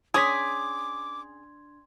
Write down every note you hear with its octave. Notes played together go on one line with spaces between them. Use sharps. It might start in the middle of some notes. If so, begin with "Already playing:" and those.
C#4 D4 G#4 C6 D6 D#6 G#6 B6